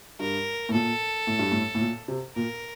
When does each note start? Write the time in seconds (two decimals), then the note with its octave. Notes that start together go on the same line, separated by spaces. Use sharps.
0.19 G2 A#4
0.69 A2
0.73 A#2 A4
1.27 A2
1.39 G2
1.52 A2
1.75 A2
1.81 A#2
2.08 C3
2.35 A#2 A#4